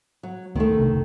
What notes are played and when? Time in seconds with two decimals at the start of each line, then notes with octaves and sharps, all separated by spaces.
0.23 F#3
0.56 D2 D#3 G#3 A3 B3
0.78 C2 C3 D4
0.91 F#1